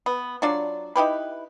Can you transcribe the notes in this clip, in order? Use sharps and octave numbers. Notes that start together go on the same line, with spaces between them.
B3
F#3 D4 F4 D5
D#4 E4 G4 B4